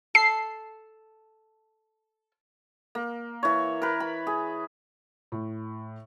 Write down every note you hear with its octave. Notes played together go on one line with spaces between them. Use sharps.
A4 C7
A#3
E3 C#5
A#4 B4
B5
G#4
A2